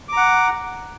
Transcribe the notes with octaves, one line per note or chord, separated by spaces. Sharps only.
F#5 A#5 D6